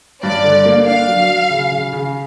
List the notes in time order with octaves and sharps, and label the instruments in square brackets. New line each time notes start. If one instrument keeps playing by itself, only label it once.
[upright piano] G2 [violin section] D5
[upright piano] D3
A#3
[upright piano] D4 [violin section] F5
[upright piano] F#3
F#3
C#3
C#3
C#3